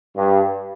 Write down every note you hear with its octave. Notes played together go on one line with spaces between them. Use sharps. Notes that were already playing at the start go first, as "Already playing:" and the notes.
G2